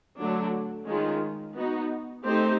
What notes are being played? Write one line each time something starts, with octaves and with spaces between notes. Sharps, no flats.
D3 F#3 A3 D4
D#3 G#3 C#4 F4
B3 D#4 F#4
A3 C4 D#4 G4 C5